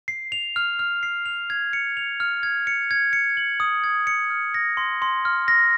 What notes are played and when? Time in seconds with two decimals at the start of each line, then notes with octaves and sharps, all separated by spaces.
0.08 C7
0.32 F7
0.56 F6
0.79 F6
1.03 C7
1.26 F7
1.50 G#6
1.73 C#7
1.97 F7
2.20 F6
2.43 G#6
2.67 C#7
2.91 G#6
3.13 C#7
3.37 F#7
3.60 D#6
3.84 G#6
4.07 C#7
4.30 F6
4.54 A#6
4.77 C6
5.02 C6
5.25 F6
5.48 A#6